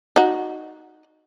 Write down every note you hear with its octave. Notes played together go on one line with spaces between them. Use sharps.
D#4 F#4